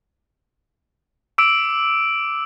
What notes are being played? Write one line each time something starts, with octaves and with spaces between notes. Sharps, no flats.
D6 E6 D7